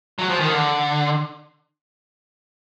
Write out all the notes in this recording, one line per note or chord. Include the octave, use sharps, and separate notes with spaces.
F#3
F3
D#3
D3